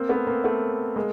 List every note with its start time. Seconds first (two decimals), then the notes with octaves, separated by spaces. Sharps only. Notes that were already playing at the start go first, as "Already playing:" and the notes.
Already playing: A#3 C4
0.09 A3 B3
0.27 A#3 C4
0.44 A3 B3
0.96 G#3 A#3